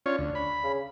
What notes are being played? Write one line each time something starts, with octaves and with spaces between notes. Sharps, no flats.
C#4 D4 F4 C#5
D2
B5
C#3